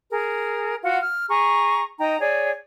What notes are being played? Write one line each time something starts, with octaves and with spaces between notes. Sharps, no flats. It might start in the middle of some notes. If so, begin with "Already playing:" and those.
G#4 A#4
F4 F#4 F#5
F6
G#4 A#5 C#6
D#4 D#5 G5 A#5
G#4 C#5 D5